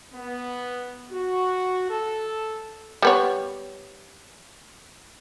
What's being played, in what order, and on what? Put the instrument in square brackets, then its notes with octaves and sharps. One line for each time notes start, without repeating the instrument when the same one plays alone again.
[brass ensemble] B3
F#4
A4
[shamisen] G3 B3 C#5